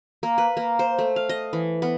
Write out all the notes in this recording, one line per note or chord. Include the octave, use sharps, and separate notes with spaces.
A#3
B4
A#3
C5
A3
F5
D#5
E3
B3